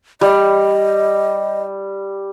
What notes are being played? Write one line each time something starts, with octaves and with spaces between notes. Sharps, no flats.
G3 D#5